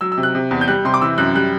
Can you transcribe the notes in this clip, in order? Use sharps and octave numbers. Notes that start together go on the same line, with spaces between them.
F#3 E6
E6
C3
F#6
C3
E2
G6
G3 F#6
C3 C6
D6
E3 E6
F#2 F#6
G3 F#6